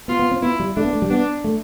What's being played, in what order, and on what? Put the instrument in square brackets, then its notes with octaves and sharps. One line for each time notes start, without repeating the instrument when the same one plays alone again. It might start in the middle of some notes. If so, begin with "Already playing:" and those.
[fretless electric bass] B3 [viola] F4
[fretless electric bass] B3
C4
[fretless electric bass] B3 [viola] E4
[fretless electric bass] G3
[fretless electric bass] A3 [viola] D4
[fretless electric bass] B3
A3
G3
[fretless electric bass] B3 [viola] D4
[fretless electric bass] A3